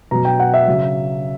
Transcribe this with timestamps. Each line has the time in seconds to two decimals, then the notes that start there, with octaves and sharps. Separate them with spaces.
0.11 B2 F#3 A#5
0.25 G5
0.40 F#5
0.54 E5
0.67 C#3 F#3